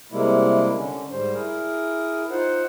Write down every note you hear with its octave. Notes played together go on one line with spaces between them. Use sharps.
C3 G3 G#3 A#3 E4
D3 C#4
G#2 G3 C5
E4 G#4 A#4
D#4 F4 C5 F#5